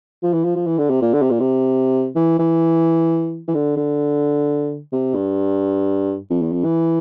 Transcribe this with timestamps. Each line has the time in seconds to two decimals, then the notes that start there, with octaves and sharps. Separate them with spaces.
0.23 F3
0.33 E3
0.44 F3
0.56 F3
0.66 E3
0.78 D3
0.90 C3
1.02 A#2
1.13 D3
1.22 C3
1.31 A#2
1.40 C3
2.16 E3
2.39 E3
3.48 E3
3.54 D3
3.76 D3
4.92 C3
5.15 G2
6.30 F2
6.42 E2
6.52 F2
6.64 E3